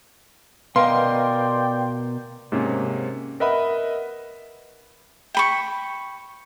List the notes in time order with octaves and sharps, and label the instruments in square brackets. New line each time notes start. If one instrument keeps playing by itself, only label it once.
[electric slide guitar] B2 A#4 D#5 [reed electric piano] B4 F5 [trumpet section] D5 G5 [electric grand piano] C6
[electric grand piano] G#2 C3 A#3 C#4
A#4 B4 D#5 E5 F#5 B5
[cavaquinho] G5 B5 C#6